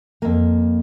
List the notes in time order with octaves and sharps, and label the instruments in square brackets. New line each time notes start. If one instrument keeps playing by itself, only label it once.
[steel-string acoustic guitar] F2 A#3